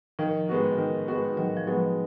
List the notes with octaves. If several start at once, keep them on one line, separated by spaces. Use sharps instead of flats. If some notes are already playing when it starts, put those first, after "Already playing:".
D#3 F3
G#3 B3 F#4
D#3
G#3 B3 F#4
D#3 F#3
F3
F#3 G#3 B3 F#4